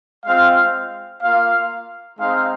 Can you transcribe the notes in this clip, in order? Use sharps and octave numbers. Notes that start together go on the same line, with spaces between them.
G#3 C4 F4 F5
A#3 F4 F5
G#3 C4 D#4 F5